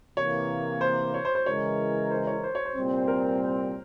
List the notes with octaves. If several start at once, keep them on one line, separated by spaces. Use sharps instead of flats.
C3 E3 A#3 C#5
C5
C#5
C5
C5
C#3 E3 G#3 E4 A#4 C#5
C5
C#5
C5
C#5
C5
C2 A#2 G3 C4
A#4